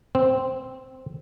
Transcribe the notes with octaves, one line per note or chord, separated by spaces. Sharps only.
C4